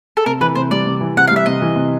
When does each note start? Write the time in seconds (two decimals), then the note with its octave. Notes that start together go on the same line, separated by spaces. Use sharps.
0.17 A4
0.26 C3 A#4
0.41 E3 B4
0.55 C3 C5
0.71 G3 D5
0.86 C3
1.01 E3
1.17 C3 F#5
1.27 F5
1.31 G3 E5
1.46 C3 D#5
1.62 E3
1.76 C3